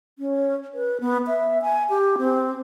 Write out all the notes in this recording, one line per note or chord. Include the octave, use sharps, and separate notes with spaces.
C#4
B4
B3
E5
G#5
G4
C4